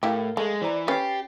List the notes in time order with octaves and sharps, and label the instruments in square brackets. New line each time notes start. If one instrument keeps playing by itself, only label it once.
[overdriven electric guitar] A2 [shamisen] E4 G4 [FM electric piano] A#4 F5
[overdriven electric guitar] G#3 [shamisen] A3
[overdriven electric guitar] E3 [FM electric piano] C5 D5 A#5
[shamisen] C#4 B4 [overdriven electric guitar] G4 [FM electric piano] A6 C7